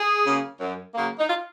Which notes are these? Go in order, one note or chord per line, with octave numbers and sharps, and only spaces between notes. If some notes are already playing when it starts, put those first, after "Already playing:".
Already playing: G#4
C#3 F#3 A#3
F#2
C#3 F#3 A#3
D#4
F4